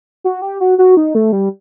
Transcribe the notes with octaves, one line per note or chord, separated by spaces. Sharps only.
F#4
G4
F#4
F#4
D#4
A3
G3